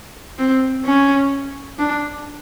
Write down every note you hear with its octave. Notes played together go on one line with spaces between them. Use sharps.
C4
C#4
D4